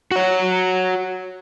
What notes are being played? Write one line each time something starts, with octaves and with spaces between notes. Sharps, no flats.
F#4 C#5